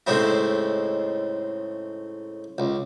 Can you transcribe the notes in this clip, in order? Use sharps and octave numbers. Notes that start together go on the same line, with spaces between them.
A2 C#3 G#3 C4 D#4 E4
C#2